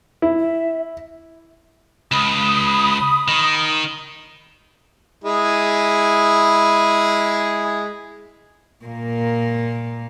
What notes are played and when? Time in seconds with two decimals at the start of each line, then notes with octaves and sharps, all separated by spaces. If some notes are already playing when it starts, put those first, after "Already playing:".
0.22 E4
0.38 E5
2.12 C#2 B5 D#6
3.28 D#3
5.24 G#3 E4 G#4
8.85 A#2 A#3